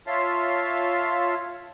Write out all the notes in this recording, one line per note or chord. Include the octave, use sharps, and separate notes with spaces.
F4 C#5 E5 F5 A5 C6